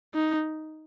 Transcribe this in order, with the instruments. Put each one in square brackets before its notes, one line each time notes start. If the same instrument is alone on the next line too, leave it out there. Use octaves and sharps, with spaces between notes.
[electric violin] D#4